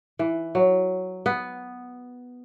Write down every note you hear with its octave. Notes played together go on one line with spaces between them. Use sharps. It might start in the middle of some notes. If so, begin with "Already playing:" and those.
E3
F#3
B3